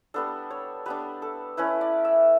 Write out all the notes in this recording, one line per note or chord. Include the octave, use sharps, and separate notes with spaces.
G3 B3 D4 A4
C#5
G3 B3 D4 B4
A4
A3 C#4 E4 B4
D5
E5